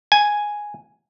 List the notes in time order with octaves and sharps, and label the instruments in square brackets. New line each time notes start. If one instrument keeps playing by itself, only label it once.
[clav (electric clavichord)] G#5